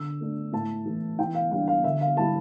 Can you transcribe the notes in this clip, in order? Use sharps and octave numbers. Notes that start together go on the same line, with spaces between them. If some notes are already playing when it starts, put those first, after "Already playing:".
Already playing: D3 E6
A3 D4
A2 A5
E3 A3
E3 G5
F5
G3 D4 F5
F5
D3 E5
F5
G3 A#3 E4 A5